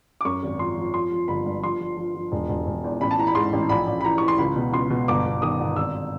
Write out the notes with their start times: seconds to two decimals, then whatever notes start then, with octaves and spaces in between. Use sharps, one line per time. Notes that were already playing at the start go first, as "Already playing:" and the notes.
0.21 D6
0.25 F#2 C#6
0.43 G#1
0.59 F3 C6
0.77 F3
0.94 F3 C6
1.11 F3
1.28 G1 B5
1.46 G2
1.63 F3 C6
1.80 F3
1.97 F3
2.15 F3
2.32 E1
2.49 E1
2.67 E1
2.84 E2
3.01 A1 B5
3.11 A5
3.19 E3 A#5
3.27 B5
3.35 G#2 C6
3.53 A1
3.69 A#1 B5
3.87 A#1
4.01 B5
4.05 E3 A#5
4.18 E3 C#6
4.28 C6
4.38 C#2 B5
4.56 B2
4.73 C#2 C6
4.90 B2
5.08 G1 D6
5.25 G1
5.42 D#3 D#6
5.59 G1
5.76 G#1 E6